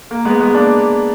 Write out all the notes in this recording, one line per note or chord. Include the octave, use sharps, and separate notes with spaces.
A#3
G#3 B3
G#3 B3
A#3 D4